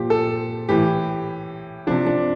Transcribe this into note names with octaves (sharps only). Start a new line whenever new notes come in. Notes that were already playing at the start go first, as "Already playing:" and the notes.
Already playing: A#2 F3 G4
A4
A2 E3 G4
C3 F3 D4
D4